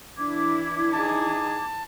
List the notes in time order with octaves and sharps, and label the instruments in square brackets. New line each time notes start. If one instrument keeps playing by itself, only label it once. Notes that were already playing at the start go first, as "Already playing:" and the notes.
[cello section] E3 D4 E4 [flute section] D6 G#6
[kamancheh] D#4 G#4 [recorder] A5